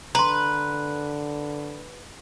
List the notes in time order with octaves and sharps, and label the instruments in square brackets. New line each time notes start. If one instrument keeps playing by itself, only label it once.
[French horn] D3 [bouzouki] B4 [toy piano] A#5 C6